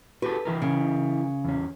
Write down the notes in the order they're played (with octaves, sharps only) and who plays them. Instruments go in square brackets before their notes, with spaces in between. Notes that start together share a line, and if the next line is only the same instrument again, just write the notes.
[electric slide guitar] F#4 G4 A4 [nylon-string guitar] B4
[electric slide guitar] E3 E4 A#4
[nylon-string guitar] C#3
[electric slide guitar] E2 C#4